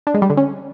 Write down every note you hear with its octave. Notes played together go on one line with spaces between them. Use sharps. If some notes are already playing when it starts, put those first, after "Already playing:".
D4
G#3
G3
D3
C#4